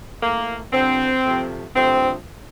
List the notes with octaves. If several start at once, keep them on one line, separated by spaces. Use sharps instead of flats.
A2 A3 A#3
G2 D3 F3 C4
C3 F3 A3
G2 D3 F3 A3 C4